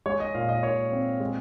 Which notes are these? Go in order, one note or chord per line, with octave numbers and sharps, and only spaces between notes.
G#3 C#5
D#5
A#2 F5
D#5
A#2 C#5
C4
G#3